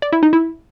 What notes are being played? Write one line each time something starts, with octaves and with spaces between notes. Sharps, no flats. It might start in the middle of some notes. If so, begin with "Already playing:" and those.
D5
E4
D#4
E4